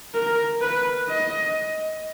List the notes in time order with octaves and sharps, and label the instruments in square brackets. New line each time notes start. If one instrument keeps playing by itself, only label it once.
[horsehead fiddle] A#4
B4
D#5